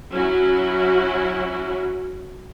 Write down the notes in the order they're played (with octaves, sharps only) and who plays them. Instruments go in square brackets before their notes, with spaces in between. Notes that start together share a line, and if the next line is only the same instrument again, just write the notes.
[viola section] F#3 C#4 E4 F#4